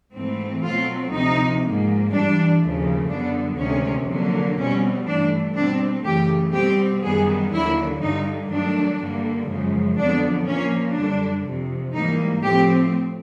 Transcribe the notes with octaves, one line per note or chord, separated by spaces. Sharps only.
G#2 E3 A3 C4
B2 F#3 A3 C4 F4
D2 C3 F3 D#4
G#2 F3 A#3
G2 E3 G3 D4
D#2 C#3 F3 A3
F#2 D3 G3 B3 D4
D2 C3 D#3 G#3 C#4
F2 D3 F#3 A#3
B2 G3 C4 C#4
G2 E3 A3 D4
B2 G3 C4 D4
F#2 C#3 E3 A3 G4
B2 G3 C4 G4
F#2 D#3 G3 B3 G#4
D#2 D3 F#3 E4
G2 D3 G3 D#4
G2 D#3 F#3 A3 D4
G2 D3 G3 A#3
F#2 C#3 F3 G#3
F2 D3 F#3 B3 D4
A#2 F3 A#3 C#4
F#2 D3 G3 D4
F2 C3 F3
G#2 E3 G3 A#3 D#4
A2 F3 A3 C4 G4